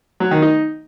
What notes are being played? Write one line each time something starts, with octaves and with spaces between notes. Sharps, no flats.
F#3
D#3
D#4